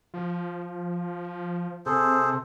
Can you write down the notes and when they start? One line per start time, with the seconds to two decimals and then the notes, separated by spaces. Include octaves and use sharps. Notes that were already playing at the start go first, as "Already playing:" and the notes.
0.14 F3
1.86 C3 G#4 A4 C5